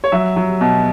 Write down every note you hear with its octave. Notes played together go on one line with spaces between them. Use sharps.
C#5
F#3 E5
F#3
B2